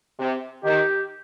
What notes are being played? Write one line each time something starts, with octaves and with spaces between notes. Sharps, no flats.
C3
D#3 G4